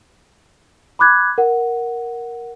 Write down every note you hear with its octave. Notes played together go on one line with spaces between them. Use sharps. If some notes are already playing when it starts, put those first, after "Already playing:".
B5 D6 F#6 G#6
A#4 F#5